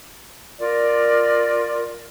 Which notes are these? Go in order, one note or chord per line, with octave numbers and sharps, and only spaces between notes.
F4 A#4 D5